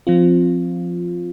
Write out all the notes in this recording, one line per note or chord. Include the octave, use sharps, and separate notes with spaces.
F3 C4 F4